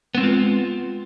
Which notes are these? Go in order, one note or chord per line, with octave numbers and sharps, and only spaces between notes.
G#3 B3 C4 F4